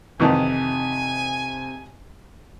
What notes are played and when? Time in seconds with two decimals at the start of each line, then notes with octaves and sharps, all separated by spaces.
0.20 F2 C3 D#3 E3 G#5